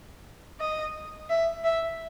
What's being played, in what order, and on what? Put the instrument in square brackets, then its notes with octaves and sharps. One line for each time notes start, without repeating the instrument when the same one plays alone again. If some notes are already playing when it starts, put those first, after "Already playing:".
[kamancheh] D#5
E5
E5